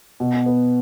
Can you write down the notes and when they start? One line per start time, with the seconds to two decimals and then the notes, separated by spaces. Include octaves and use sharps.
0.20 B2
0.46 B3